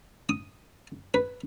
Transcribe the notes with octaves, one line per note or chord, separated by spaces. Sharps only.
D#6
B4